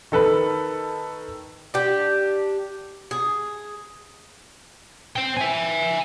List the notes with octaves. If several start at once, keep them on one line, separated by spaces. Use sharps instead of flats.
D#3 A4 B4 B5
D4 G4
G#4
C5 G5
E5 G#5